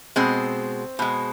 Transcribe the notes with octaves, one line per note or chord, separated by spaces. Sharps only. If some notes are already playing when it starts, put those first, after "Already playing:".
B2 G#3 C4
B2 G#3